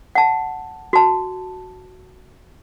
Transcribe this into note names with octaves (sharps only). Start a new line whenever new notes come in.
F#5 A5
F#4 A5